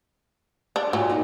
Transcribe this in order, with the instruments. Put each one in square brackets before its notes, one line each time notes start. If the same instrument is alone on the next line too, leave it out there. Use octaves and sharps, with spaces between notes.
[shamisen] D4
[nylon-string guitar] A#2 [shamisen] F#3
[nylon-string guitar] D#4